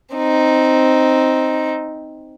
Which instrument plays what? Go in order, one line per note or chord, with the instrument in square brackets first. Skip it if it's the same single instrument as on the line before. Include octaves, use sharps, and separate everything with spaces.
[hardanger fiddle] C4 D#4